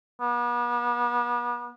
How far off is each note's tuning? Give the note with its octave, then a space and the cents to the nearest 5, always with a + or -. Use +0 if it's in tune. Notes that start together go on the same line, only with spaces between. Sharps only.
B3 -40